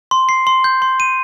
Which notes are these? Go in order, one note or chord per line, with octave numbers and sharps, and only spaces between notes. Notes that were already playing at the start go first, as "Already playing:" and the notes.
C6
C7
C6
G6
C6
D#7